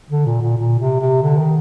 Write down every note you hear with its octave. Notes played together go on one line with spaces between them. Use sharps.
D3
A#2
A#2
A#2
C3
C3
D3
D#3